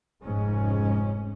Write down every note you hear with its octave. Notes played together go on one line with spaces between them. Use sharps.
F1 G#2 G#3 C#4